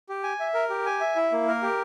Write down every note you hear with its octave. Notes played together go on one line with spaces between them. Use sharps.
G4
G#5
E5
A#4
G4
G#5
E5
E4
A#3
A#4
G4